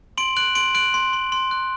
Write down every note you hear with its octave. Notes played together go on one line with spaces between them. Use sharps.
C6 D7 F#7
F#6 D7 F#7
C6 D7 F#7
F#6 D7 F#7
C6
C6
C6
F#6